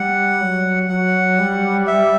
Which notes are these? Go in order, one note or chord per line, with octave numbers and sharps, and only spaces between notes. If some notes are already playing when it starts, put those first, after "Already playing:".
Already playing: G3 F#5
F#3
F#3 F#5
G3
E5